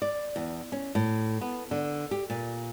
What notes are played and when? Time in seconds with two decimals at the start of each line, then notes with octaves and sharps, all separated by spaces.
0.02 D5
0.36 E2
0.72 C#4
0.95 A2
1.41 B3
1.71 D3
2.11 G4
2.30 A#2